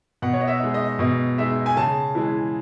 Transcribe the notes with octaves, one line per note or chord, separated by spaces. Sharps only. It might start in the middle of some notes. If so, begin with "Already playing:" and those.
B2 F#5
C#5
D#5
E5
G#3 D#4
D#5
B2 D#5
G#3 D#4 E5
G#5
C#3 A5
E3 G#3